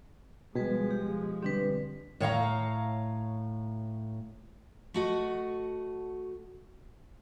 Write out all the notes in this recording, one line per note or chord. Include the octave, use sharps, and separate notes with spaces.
B2 F3 G3 G#3 G#4 B4
G4
D3 G3 C4 D4 G4 B4
A2 C#5 F5 A#5
A3 F#4 D#5